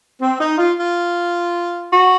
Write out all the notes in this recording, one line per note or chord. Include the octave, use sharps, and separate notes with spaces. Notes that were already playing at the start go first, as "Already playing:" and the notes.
C4
D#4
F4
F4
F#4